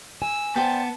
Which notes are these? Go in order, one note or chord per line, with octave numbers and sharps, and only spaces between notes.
G#5 E6
B3 C5 D5 G5 A5